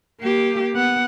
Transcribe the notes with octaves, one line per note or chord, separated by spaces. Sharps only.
A#3 G4
B3 F#5